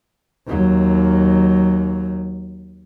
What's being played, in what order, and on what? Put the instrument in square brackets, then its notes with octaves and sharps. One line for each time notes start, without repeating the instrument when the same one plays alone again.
[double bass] D#2 F#3